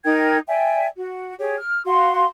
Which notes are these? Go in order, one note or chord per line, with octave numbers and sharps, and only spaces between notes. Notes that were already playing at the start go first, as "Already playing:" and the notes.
D#4 A#4 G5 G#6
D5 E5 G5 G#5
F#4
G4 G#4 C#5
F6
F#4 F5 C6